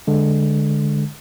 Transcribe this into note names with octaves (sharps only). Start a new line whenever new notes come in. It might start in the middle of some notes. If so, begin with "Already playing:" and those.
D3 G#3